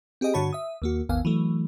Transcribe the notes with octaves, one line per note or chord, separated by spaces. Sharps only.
C4 G4 G#4 D#5 G5
G2 D3 F#4 C#5 A5 B5
E5 D#6
D#2 A#3 F#4
G#1 D#2 B3 F5 G#5
E3 F#3 A3